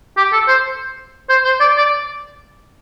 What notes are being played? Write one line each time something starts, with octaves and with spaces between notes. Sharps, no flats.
G4
A4
C5
C5
C5
D5
D5